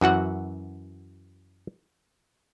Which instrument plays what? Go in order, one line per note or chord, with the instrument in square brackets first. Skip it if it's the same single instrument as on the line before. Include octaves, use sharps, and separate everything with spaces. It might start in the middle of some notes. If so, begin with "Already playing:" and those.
[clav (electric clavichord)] F#2 E3 F#4 F#5